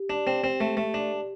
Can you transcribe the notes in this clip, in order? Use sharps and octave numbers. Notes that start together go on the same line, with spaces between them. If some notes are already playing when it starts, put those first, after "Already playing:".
Already playing: G4
D4
C4
C4
A3
A3
D4